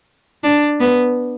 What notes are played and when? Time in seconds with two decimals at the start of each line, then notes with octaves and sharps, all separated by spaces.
0.44 D4
0.80 B3